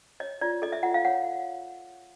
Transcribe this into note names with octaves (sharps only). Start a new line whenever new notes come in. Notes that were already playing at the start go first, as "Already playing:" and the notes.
C#5 D#5
F4 D5
A4 D#5
E5
F4 F#5
F5
C#5 F#5